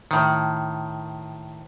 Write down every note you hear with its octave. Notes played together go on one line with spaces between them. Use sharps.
A2 D#3